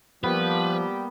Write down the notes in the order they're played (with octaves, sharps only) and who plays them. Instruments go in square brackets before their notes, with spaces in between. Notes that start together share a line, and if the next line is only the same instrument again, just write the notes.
[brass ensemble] F3 [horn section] G3 G4 [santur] A#3 B3 [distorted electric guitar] B4